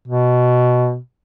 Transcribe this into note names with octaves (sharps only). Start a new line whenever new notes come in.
B2